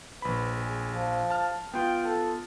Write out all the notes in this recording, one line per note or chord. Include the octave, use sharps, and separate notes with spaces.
A#1 B4 B5
G#4
F3
A5 F6
B3 F4 G5
A4